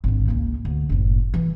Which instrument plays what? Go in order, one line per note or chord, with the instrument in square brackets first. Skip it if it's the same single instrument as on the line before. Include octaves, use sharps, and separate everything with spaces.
[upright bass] G#1 D3
C#2 A#3
D2
F#1 A2
E3